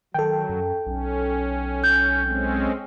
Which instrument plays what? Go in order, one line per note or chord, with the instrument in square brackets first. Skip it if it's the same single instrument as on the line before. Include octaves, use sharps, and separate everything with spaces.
[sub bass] D#3 [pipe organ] F#3 [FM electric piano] A4 G5
[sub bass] F#2
[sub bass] B1 [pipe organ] C#4
[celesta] G6
[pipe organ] G#3 C4 C#4